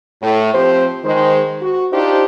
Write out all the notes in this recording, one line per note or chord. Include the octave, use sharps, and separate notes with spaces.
A2
F3 C4 G4 C5
D#3 G#3 C5
F#4
D4 D#4 F4 G4 C5